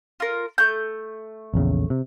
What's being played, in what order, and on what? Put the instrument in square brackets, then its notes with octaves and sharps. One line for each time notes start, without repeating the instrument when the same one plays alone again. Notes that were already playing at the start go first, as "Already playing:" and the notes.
[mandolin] F4 A#4
A3 G6
[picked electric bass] A#1 E2 C#3
C3